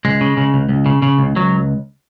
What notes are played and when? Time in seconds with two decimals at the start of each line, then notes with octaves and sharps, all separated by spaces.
0.05 C#2 G#3
0.21 C#3
0.37 C#3
0.54 C#2
0.69 C#2
0.86 C#3
1.02 C#3
1.19 C#2
1.36 C#2 F#3